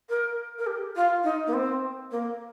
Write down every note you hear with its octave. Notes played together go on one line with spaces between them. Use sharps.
A#4
A#4
G4
F4
D#4
A#3
C4
A#3